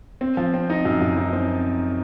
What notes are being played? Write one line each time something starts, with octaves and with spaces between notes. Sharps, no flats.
C4
F3
C4
D#4
F#2
F#2
D#4
C4